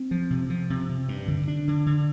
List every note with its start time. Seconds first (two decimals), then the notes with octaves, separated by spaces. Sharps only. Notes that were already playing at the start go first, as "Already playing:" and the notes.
Already playing: C4
0.11 F3
0.30 C3
0.50 F3
0.70 C3
0.89 C3
1.09 G2
1.28 D3
1.48 D4
1.67 D3
1.86 D3